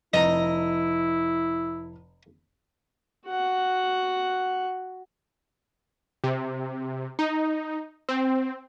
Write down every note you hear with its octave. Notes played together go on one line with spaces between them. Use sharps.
F1 E4 D#5 A#5
F#4 F#5
C3
D#4
C4